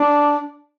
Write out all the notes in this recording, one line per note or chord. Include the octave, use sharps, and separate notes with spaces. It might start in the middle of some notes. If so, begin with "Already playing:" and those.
Already playing: D4